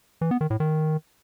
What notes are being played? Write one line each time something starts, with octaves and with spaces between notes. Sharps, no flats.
E3
B3
D#3
A2
D#3